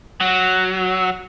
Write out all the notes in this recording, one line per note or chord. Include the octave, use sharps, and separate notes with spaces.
F#3